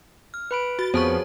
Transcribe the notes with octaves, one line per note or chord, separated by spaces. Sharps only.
F6
B4 B5 D7
F#4 A6
F2 F3 B3 G#4 C5 C#5 A5 C#6